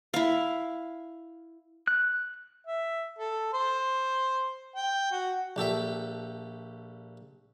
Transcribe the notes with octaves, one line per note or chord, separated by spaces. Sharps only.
E4 F5
F#6
E5
A4
C5
G5
F#4
A#1 G4 A4 E5